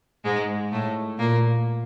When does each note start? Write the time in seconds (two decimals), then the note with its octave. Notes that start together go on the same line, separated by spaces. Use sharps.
0.24 G#2 G#3
0.72 A2 A3
1.18 A#2 A#3